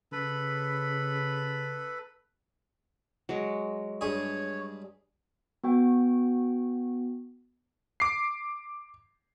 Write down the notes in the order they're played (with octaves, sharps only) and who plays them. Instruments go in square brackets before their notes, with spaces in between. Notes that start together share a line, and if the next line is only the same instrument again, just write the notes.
[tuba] C#3 [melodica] A4 B4 B5
[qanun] F#3 G#3
[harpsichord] G2 G#4 [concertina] C#5
[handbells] B3 F#4 G5
[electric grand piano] D6 C7